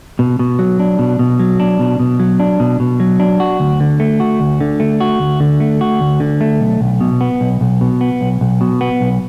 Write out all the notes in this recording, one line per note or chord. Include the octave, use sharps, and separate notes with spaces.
B2
B2
F#3
D4
B2
B2
F#3
D4
B2
B2
F#3
D4
B2
B2
F#3
D4
F#4
D2
D3
A3
F#4
D2
D3
A3
F#4
D2
D3
A3
F#4
D2
D3
A3
B1
B1
B2
B3
B1
B1
B2
B3
B1
B1
B2
B3
B1